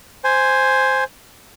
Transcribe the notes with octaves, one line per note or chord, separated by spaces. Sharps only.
C5 G#5